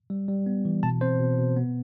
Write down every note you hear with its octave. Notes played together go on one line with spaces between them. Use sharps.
G3
G3
B3
E3
B2 A5
C4 C5
B2
B2
B3